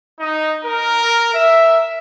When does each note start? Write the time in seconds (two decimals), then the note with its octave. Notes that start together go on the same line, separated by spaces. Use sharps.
0.20 D#4
0.65 A#4
1.34 E5